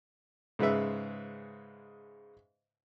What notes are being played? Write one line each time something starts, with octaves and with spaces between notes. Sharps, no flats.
G#2 C#3 G#3 B4 E5